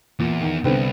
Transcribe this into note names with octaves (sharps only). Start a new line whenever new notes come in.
E2 A#2
D#3
C2 D3 B3 C4